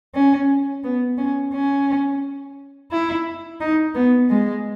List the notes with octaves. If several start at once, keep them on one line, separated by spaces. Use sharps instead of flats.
C#4
B3
C#4
C#4
E4
D#4
B3
G#3